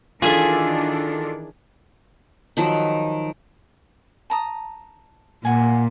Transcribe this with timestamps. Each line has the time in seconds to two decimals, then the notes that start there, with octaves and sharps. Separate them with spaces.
0.22 D#3 E3 D4 F4 G#4 A4 E5
2.57 D#3 F3 F#3
4.30 A5 A#5 D#6
5.45 A#2 F#5 G#5